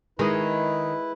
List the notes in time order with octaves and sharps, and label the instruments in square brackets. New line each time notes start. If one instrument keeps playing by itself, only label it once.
[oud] D#3 [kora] G#3 G#4 [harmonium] E4 B4